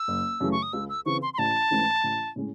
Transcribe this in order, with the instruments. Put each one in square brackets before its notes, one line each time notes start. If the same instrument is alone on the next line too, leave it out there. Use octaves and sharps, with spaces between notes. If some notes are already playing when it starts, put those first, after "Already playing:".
Already playing: [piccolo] E6
[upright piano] F#1
F#2 C#3 E3 A3
[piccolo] C#6
D#6
[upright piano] C#2 [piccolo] E6
[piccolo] E6
[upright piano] C#3 E3 C4 [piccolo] C#6
[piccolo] C6
C6
[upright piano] A1 [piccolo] A5
[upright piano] G#2 E3 A3 C#4
A1
A2 G#3 C#4